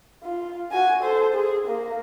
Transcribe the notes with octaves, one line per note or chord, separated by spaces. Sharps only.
F4
F#4 G#5
A4 C5
G#4
A#3